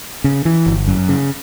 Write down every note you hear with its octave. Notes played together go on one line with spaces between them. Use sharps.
C#3
E3
G1
F#2
C#3